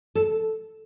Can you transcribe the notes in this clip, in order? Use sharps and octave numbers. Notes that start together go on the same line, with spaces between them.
A4